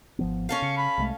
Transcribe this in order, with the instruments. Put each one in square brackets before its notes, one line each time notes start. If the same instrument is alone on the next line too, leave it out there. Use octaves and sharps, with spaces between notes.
[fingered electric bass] G#1 F3 B3
[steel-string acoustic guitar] C#4 A4 F5
[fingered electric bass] C#3 [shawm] C#6
[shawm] B5
[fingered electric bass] C2 G#3 A3